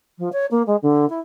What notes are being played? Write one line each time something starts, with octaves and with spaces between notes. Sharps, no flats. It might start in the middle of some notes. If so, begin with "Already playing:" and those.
F3
C#5
A#3
G#3
D3
E4